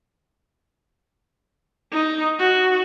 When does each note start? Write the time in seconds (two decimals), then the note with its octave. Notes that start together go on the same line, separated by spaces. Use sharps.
1.93 D#4
2.40 F#4